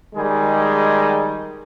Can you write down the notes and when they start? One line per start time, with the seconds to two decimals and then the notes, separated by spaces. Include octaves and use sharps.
0.15 D#3 G3 G#3 G#4